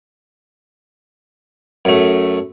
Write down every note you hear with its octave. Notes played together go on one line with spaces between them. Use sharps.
F#2 A3